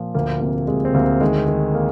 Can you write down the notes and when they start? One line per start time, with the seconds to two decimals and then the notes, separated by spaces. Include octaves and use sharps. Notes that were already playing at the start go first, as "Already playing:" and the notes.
Already playing: A#2 F3
0.14 D2 A#3
0.41 C3 A#3
0.68 C3 G#3
0.85 C4
0.94 D2 A#3
1.21 D#3 G#3
1.48 D#3
1.75 A#3